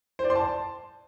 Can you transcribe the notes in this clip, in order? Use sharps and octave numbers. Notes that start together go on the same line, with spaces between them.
C5
D5
C6
A5